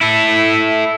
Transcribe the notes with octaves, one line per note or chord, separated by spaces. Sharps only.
E4 A4